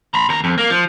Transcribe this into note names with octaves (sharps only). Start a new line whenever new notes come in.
A#5 B5
D#2 A#5
F2
A#3
F3